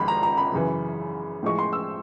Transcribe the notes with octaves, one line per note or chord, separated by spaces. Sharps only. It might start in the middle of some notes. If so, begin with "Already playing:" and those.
Already playing: G#1 G#2 F3 B5
A#5
A#5
B5
F#2 C#3 E3
A2 F3 G#3 C#6
C6
E6